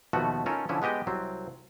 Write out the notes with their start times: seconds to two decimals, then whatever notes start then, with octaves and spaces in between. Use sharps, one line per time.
0.13 D#2 B2 F3 A3 B3 F#4
0.46 C#4 D#4 F4 A4 A#4
0.69 D3 F3 C#4 E4
0.82 G#3 B3 G4 D#5 G5
1.07 C2 F#3 C4